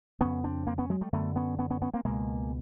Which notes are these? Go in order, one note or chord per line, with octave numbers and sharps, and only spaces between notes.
F2 C#3 B3 C#4
C4 D4
A#3 C4
B3 C#4
F#3 G#3
G3 A3
F#2 D3 A3 B3
B3 C#4
B3 C#4
B3 C#4
B3 C#4
A#3 C4
C#2 B2 G#3 A#3